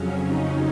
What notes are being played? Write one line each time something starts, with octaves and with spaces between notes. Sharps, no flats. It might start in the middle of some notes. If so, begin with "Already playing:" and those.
Already playing: F2 C#3 F#3 C#4
D#4